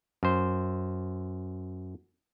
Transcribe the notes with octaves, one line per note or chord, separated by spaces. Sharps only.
F#2 C5